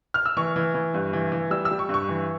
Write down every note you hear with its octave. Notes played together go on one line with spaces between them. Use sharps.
F6
E6
E3 C#6
E3
E3
G2
E3
E3
G3 E6
E6
G3
C#6
G2 C#6
E3